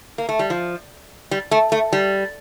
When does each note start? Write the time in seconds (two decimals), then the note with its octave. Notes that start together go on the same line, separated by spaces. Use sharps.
0.18 A#3
0.29 A3
0.39 G3
0.50 F3
1.31 G3
1.51 A3
1.72 A3
1.93 G3